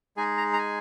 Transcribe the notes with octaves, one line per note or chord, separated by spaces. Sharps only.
G#3 D#4 G#4 G#5
A#5
A#5
G#5